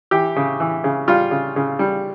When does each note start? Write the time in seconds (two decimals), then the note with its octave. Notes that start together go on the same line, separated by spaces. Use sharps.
0.11 E3 G4
0.36 C#3
0.60 E3
0.84 C#3
1.08 G3 F4
1.31 C#3
1.56 C#3
1.79 G3